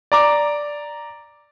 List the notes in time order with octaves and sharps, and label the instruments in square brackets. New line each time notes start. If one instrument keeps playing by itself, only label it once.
[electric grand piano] D5 A#5 D6